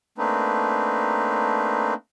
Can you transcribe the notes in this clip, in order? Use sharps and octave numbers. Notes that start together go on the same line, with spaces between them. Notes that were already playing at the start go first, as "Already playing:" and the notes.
A3 A#3 C4 D4 D#4 B4